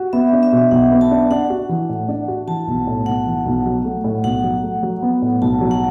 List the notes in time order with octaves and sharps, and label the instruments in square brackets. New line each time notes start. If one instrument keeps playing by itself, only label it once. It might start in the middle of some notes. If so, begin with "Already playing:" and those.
Already playing: [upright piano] F#4
[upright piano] B3 [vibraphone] E5
[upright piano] D4
[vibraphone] E5
[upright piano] B2
[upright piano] B1 [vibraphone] F#5
[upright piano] B3
[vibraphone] A5
[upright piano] D4
[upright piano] D4 [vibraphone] F#5
[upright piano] F#4
E3
A2
D4
F#4
[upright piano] E3 [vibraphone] A5
[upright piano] B1
A2
[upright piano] B1 [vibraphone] F#5
[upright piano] E3
B1
F#3
A3
A2
[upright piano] B1 [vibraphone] F#5
[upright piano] F#3
A3
F#3
B3
A2
[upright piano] B1 [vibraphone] A5
[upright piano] F#3
[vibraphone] F#5